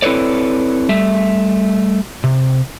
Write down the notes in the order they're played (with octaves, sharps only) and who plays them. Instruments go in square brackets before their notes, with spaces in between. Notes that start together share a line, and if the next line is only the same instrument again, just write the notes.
[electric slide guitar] C4 E4 A4 B4 C#5 D5
G3 A3 E5
C3